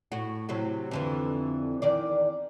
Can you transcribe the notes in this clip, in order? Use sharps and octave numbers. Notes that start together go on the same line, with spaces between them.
A2 F#4
A2 C3 F#3
F2 D3 E3
E2 D#3 D5